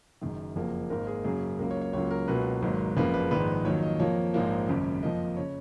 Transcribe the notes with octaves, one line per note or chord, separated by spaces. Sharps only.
F#1 F#2 D#3
F#1 F2 F3 A#3
G#1 G#2 D#3 A#3 A#4
G#4
F#2 C#3 F#3 A#3 G#4
C#2 C#3 F#3 A#3 A#4
C#5
C#5
C#2 C#3 F#3 A#3 C#5
A#4
C#2 B2 F#3 A#3 B4
G#1 G#2 F#3 A#3
F#1 F2 C#3 F3 A#3 B4
B4
A#1 G#2 D#3 G#3 B4
F2 D#3 F#3 A#3 C#5
D#5
F2 F3 A#3 C#5
A#1 G#2 F3 A#3
G#1 F#2 C#3
F2 F3 A#3 D#5
C#3 C#5